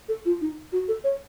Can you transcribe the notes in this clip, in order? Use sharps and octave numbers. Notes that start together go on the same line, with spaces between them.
A4
F4
D#4
F#4
A4
C#5